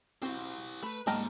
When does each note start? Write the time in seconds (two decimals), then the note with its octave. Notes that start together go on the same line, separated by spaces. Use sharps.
0.22 C4 E4 F#4 G4
0.83 A3 B4 B5
1.07 G#2 G3 A#3 D#5 G5 A5 A#5 F6